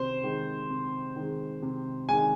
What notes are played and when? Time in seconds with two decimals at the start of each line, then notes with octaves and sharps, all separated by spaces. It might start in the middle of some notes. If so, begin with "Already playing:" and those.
Already playing: C3 D#3 C5
0.23 D#3 G#3
0.70 C3
1.16 D#3 G#3
1.62 C3
2.09 D#3 G#3 G#5